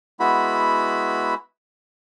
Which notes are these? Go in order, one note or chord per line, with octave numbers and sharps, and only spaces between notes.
G#3 B3 E4 F#4 B5